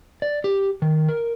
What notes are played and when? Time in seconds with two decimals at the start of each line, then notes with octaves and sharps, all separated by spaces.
0.22 D5
0.44 G4
0.82 D#3
1.09 A#4